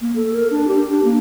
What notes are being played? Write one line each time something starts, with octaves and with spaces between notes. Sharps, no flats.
A#3
A4
A#4
D4
G4
D4
A#3